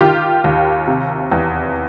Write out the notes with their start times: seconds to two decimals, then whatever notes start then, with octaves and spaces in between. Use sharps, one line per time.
0.01 D#3 F4 G4
0.44 D#2
0.87 C3
1.32 E2